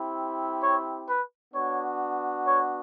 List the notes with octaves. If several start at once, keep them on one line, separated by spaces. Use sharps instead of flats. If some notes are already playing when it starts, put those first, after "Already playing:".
Already playing: C4 E4 G4
C#5
B4
B3 D4 F#4 C#5
C#5